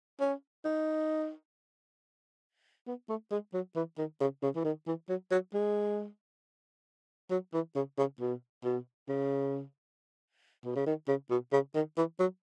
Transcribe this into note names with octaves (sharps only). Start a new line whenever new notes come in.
C#4
D#4
B3
A3
G#3
F#3
E3
D#3
C#3
C#3
E3
D#3
E3
F#3
F#3
G#3
F#3
E3
C#3
C#3
B2
B2
C#3
B2
C#3
D#3
C#3
B2
C#3
D#3
E3
F#3